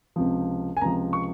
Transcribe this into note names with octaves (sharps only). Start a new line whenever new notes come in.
C#2 C3 F3
G#5
C#2 C3 F3 A#5
C#6